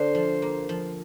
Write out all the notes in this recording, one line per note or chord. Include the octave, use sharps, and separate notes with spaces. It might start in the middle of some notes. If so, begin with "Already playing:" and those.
Already playing: D3 C5
F3
A#3
F3